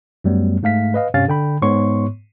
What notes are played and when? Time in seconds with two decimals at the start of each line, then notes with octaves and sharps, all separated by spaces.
0.24 F#2 F#3 G3 A3 B3
0.63 G#2 A3 F5 B6
0.94 B4 D#5 F5
1.14 G2 C3 C#4 G4 F5 A6
1.28 D3 G5 B5
1.62 G#2 B3 C#5 C6 C#6